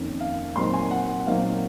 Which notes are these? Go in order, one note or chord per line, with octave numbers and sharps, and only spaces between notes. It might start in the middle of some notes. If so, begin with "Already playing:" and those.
Already playing: F2 D#3 A#3 C#4
F5
A#2 F#3 C4 D#4 C6
G#5
F#5
F#5
F#5
A#2 F#3 C4 D#4 F5